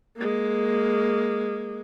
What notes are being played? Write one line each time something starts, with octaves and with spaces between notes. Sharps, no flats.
G#3 A#3